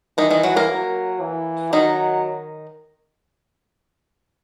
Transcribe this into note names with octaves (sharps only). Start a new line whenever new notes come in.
D#3 E3 D#4
D#3 D#4
F#3 F#4
A#3 A#4
F#3
E3
D#3 F#3 D#4